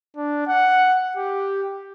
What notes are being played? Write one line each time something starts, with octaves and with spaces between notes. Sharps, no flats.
D4
F#5
G4